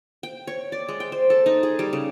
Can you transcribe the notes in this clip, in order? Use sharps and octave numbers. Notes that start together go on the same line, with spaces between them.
G5
C#5
D5
G#3
G5
C5
A4
D#4
G#4
G3
C#3